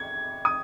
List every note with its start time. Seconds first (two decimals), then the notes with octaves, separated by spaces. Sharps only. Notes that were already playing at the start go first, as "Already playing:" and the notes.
Already playing: G#6
0.45 D#6